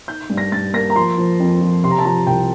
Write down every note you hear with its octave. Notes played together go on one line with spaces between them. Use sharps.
D#4 G6
G2
A#6
G2 A6
A#3 A#6
A#5
F3 C6
F3
F2
F3
C3 C6
A#5
A5
F3 A#5
C2 G5